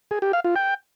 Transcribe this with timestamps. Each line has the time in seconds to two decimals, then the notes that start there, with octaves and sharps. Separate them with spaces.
0.11 G#4
0.22 G4
0.33 F5
0.44 F4
0.56 G5